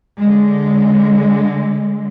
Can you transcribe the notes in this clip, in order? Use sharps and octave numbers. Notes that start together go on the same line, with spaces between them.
D3 G#3